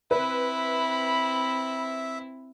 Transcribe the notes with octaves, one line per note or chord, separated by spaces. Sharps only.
C4 E4 B4 E5 B5